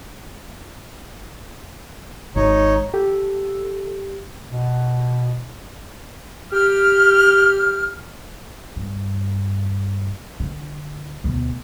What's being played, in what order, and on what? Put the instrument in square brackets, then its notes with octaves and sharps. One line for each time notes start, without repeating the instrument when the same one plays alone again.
[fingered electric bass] G#1 [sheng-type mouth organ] D#4 C#5
[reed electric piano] G4 [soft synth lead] A4
[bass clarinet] B2
[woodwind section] G4 F6
[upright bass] G2
D3
D2 B2